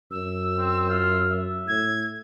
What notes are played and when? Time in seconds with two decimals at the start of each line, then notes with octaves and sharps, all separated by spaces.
0.11 F#2 E6
0.58 C4
0.89 F4
1.30 E5
1.68 A2 G#6